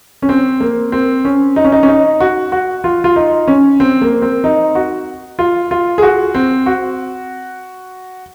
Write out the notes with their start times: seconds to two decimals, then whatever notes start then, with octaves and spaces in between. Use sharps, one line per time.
0.22 C#4
0.29 C4
0.60 A#3
0.92 C4
1.25 C#4
1.56 D#4
1.64 C#4
1.72 D#4
1.83 C#4
1.88 D#4
2.20 F#4
2.52 F#4
2.84 F4
3.04 F4
3.16 D#4
3.48 C#4
3.80 C4
4.01 A#3
4.22 C4
4.44 D#4
4.75 F#4
5.39 F4
5.71 F4
5.98 G#4
6.02 F#4
6.35 C4
6.66 F#4